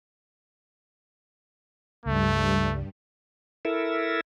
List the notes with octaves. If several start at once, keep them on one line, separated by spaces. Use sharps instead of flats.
C#2 G2 G3 A3
E4 A4 A#4 E5